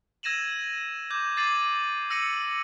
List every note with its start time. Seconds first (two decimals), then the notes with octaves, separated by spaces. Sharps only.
0.23 E6 G#6 A#6 D#7 E7 F#7
1.10 D6 G6 G#6
1.37 D6 A6 C7 D7 D#7 F#7
2.10 E6 A#6 C#7 D#7 F#7